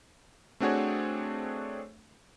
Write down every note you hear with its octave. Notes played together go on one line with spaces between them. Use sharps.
A3 C4 D4 F#4 G#4 C#5